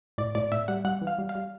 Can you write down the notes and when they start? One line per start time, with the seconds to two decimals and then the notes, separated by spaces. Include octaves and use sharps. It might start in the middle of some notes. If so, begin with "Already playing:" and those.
0.18 A2 D5
0.35 A2 D5
0.52 A2 E5
0.68 G3 F#5
0.85 G3 F#5
1.01 E3
1.07 F5
1.18 G3
1.29 F5
1.35 G3